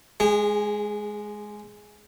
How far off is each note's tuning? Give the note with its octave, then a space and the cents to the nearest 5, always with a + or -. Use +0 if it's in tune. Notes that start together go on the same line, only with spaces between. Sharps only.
G#3 +5 G#4 -30